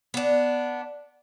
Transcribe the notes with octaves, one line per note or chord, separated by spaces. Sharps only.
B3 D4